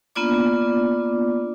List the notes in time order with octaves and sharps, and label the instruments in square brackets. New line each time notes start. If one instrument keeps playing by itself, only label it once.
[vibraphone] A#3 B3 D4 F4 D5 D6